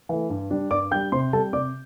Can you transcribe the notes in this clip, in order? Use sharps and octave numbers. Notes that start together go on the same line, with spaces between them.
E3 A3
G2
G3 D4
G2 D5 D6
G3 D4 G5 G6
C3 C5 C6
G3 C4 A4 A5
C3 D5 D6